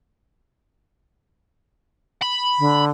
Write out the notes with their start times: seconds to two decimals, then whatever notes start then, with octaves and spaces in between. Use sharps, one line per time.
2.22 B5
2.59 D3